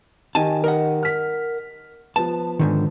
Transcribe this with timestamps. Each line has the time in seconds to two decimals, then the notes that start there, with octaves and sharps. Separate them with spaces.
0.35 D#3 D#4 G4 G#5 A5
0.64 A#4 D#5 F#5
1.03 F6 B6
2.16 F3 B3 A5
2.59 G#2 D3 D#3